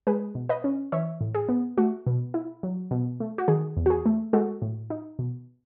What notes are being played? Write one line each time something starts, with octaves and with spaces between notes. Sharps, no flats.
G#3 G#4 B4
B2
B4 D#5
C#4
E3 C#5 E5
A2
G#4
B3
A3 F#4
B2
E4
F#3
B2
A3
F#4
D#3 G#4
E2
F#4
G#4
A3
G#3 F#4 A4
A2
D#4
B2